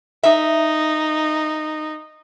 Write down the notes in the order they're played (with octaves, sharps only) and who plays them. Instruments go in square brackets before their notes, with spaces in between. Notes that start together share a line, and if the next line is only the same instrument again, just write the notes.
[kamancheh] D#4 [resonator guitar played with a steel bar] E5